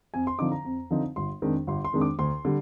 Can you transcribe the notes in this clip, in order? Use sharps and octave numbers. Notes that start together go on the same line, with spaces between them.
F2 G#5
C6
D3 F3 C4 D#4 D6
A#5
F2
D3 F3 C4 D#4
G1 C6
F2 D#3 G#3 D4
G1 C6
C6
F2 D#3 G#3 D4
D6
D2 C6
D3 G3